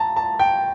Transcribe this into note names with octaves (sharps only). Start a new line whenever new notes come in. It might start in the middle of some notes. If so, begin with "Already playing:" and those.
Already playing: A5 A#5
A5
G5